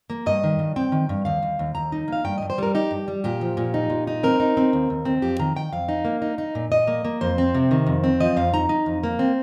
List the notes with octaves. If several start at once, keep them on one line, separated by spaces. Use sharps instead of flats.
A#3
G2 D#5
D#3
G2
C4 G5
D#3
G2
D#2 F5
D#2
D#2
D#2 A#5
D#4
A#3 F5
G2 G5
G2 D#5
C5
G3 A#4
D#4 G4
G2
G3
A#2 G4
F3
A#2
D#4
A#2
D#4
C4 A#4
D#4
C4
D#2
D#2
C4
F2 G4
D#3 A#5
D#3 G5
F2 F5
D#4
A#3
D#4
D#4
A#2
A#2 D#5
A#3
A#3
F2 C5
C4
C3
D#3
F2
C4
F3 D#5
F2 F5
D#4 A#5
D#4
F2
A#3
C4